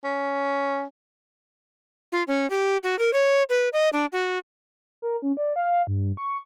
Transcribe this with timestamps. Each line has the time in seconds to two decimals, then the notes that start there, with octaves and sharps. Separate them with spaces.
0.04 C#4
2.12 F4
2.28 C#4
2.50 G4
2.83 F#4
2.99 A#4
3.13 C#5
3.50 B4
3.73 D#5
3.93 D4
4.12 F#4
5.02 A#4
5.22 C#4
5.37 D5
5.56 F5
5.87 G2
6.17 C#6